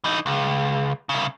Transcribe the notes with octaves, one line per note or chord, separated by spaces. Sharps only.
E3 D#4
C#2
C2 C#3